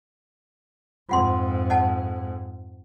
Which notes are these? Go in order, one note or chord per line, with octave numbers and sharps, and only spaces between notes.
F2 G#2 F4 F#5 C6
D#5 F#5 A5